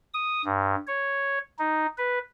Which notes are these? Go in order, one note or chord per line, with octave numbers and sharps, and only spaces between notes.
D#6
G2
C#5
D#4
B4